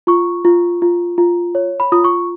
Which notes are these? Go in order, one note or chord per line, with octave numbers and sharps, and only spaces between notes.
F4 C#6
F4
F4
F4
C#5
B5
F4 D#6
C#6